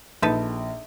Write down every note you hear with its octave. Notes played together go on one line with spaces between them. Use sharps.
A#1 D#4 A4 B4